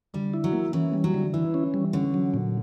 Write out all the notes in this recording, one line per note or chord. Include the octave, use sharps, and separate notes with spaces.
D3 G3
E4
F#3
A#3
E3 C#4
G3
F#3
D3
E3 E4
C#4
G3
D3 C#4
F#3
A#2